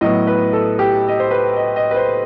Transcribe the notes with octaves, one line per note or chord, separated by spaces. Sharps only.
A2 F#3 B3 D#5
B4
A4
G4
D#5
C5
B4
D#5
D#5
B4
C5